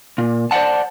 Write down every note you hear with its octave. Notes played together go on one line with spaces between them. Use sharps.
A#2
C5 D5 E5 F#5 A5